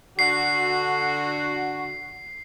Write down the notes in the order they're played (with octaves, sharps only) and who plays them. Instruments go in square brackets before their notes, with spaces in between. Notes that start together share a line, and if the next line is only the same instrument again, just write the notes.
[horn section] D3 F#4 [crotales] C7